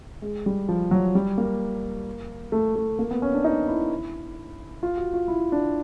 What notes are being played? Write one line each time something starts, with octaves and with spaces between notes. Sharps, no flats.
G#3
G3
F3
F#3
G3
A#3
A3
A3
A#3
B3
C#4
D4
D#4
E4
F4
F#4
F4
E4
D4